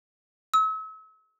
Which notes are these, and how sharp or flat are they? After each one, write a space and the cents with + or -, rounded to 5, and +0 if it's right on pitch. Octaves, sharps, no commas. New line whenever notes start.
E6 -40